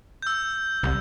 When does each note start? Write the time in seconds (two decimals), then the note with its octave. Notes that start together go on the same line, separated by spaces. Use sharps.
0.22 E6 G6
0.83 C2